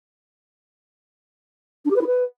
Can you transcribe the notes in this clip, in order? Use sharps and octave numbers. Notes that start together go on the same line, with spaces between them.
D4
G4
B4
E4
B4